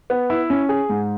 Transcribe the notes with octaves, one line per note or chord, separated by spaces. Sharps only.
B3
E4
C#4
G#4
G#2